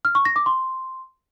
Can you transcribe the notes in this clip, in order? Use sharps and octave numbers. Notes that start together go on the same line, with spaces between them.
F6
C#6
A#6
D6
C6